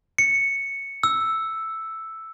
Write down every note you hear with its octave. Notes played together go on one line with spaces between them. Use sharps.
C#7
E6